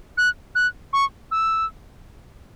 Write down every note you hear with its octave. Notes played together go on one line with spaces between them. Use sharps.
F#6
F#6
C#6
E6